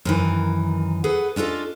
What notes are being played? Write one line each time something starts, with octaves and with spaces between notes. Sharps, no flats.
F#2 D#3 E3
G#4 A4 B4 F#5
C#4 D4 F4 A4 D#5